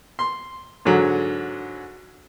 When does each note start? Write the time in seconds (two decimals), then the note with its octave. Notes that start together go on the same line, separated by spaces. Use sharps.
0.19 C6
0.85 G#2 D3 F#3